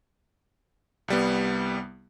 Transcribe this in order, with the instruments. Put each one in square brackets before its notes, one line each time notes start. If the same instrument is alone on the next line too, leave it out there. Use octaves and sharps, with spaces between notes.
[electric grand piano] C2 G3 B3